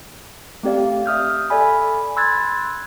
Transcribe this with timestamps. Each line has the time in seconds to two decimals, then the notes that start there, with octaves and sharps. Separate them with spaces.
0.63 A3 C4 G4 D5 F5
1.06 E5 D#6 F6 G6
1.50 A4 D5 E5 G#5 B5
2.16 B5 C6 E6 F#6 G#6 A6